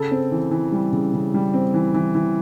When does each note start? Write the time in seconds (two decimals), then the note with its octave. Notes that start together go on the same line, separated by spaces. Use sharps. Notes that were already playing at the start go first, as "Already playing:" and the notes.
Already playing: C#3 A4
0.11 C4
0.31 E3
0.51 E3
0.72 G3
0.92 C#3
1.14 C#3
1.34 G3
1.54 C4
1.74 E3
1.94 E3
2.15 E3